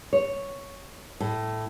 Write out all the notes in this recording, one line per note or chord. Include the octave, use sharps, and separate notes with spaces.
C#5
A2